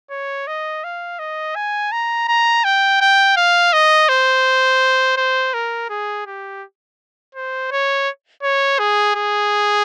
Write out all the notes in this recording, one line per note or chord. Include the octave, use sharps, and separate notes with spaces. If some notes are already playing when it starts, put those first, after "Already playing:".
C#5
D#5
F5
D#5
G#5
A#5
A#5
G5
G5
F5
D#5
C5
C5
A#4
G#4
G4
C5
C#5
C#5
G#4
G#4